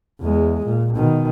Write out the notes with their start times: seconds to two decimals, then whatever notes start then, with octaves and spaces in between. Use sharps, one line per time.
0.22 E2 G#3
0.66 A#2
0.97 B2 D#3